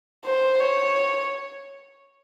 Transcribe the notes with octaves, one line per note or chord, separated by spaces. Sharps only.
C5
C#5